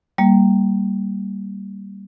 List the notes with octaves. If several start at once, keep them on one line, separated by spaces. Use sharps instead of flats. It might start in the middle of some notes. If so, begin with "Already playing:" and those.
G3 A#3